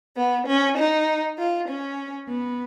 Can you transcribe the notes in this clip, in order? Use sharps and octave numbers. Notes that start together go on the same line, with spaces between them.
B3
C#4
D#4
F4
C#4
B3